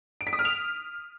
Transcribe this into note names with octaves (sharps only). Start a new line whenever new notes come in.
D7
B6
D#6
F6
F7